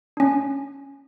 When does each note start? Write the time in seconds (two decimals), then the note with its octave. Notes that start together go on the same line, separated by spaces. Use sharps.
0.17 C#4 D4